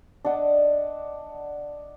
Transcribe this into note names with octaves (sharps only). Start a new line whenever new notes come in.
D4 D#5 F#5 A5